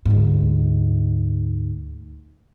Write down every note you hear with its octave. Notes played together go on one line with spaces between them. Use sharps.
D2 G#2